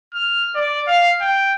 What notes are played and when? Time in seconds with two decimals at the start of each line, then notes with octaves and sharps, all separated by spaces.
0.14 F6
0.55 D5
0.87 F5
1.21 G5